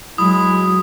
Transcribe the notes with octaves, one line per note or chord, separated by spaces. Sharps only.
F#3 G#3 E4 D#6